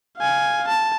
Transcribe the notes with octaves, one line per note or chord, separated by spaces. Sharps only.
F5 G#5
A5